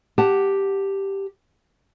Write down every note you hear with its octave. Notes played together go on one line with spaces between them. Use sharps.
G4 F#5 A5